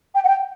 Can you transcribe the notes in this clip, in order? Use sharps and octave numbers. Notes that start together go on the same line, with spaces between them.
G5
F#5
G5